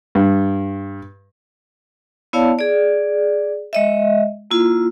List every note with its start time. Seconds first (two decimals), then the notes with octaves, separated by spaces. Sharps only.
0.15 G2
2.33 B3 E4 C#5 D5 F5 A5
2.59 G#4 D5
3.73 G#3 D#5 E5
4.51 A#3 E4 F4